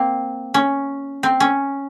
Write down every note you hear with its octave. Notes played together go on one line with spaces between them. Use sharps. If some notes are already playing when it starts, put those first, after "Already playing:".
Already playing: A#3 C4
C#4
C4
C#4